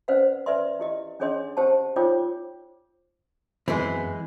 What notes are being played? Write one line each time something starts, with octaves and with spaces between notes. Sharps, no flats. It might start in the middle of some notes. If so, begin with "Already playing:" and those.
C#4 B4 C5 D5 F5 F#5
B4 D5 E5 C6
E4 G4 D#5
C#4 D4 G#4 C#5 D#5 C6
G4 C5 F#5 A5
D#4 F4 C5 C#5 G5 D6
F#2 E3 G#3 B3 C4